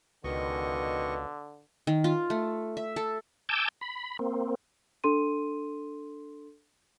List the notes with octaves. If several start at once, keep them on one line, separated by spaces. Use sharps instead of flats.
C#2 B2 D3 D#3 D#5 C#6
D#3
F4
A3
E5
A4
G#5 A5 D6 E6 G6
B5
A#3 C4
D4 A4 C6 D#7